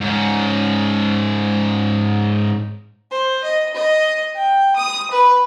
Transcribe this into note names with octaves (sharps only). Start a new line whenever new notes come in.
G#2 C#4
C5
D#5
D#5
G5
D#6
B4